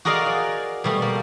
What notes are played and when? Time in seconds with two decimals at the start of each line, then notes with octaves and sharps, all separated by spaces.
0.05 F#4 G#4 A#4 D5 D#5 F5
0.26 D5
0.84 B2 G3 A3
1.02 A#3